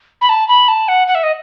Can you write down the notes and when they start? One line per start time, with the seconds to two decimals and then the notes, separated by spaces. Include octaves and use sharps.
0.21 B5
0.29 A5
0.48 B5
0.68 A5
0.88 F#5
1.07 F#5
1.15 E5
1.23 D#5